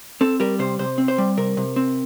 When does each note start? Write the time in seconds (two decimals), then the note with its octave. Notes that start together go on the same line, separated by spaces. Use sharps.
0.21 C4 A4
0.40 G3 A#4
0.59 C3 C5
0.79 C3 C5
0.98 C4
1.08 C5
1.18 G3
1.37 C3 A#4
1.57 C3
1.76 C4